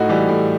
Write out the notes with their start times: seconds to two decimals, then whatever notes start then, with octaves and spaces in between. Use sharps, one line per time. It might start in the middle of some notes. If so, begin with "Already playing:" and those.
Already playing: A2 D#4 F#4
0.09 E3 G3
0.28 A2